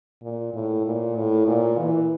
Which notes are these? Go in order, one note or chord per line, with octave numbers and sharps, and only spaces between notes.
A#2
A2
A#2
A2
A#2
E3